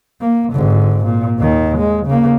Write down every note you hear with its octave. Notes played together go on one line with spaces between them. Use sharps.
A#3
G#1 D3
A#2
D#2 D#3
G#3
C#3 A#3